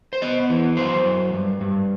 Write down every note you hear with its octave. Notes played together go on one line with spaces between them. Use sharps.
C5
B3 D#5
E3
F#2 C5
F#2
G2
G2